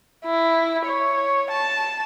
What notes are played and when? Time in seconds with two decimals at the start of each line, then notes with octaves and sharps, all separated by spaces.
0.25 E4
0.85 C#5
1.50 A5